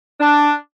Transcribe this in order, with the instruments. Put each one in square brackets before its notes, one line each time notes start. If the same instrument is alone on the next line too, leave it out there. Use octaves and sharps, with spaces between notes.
[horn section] D4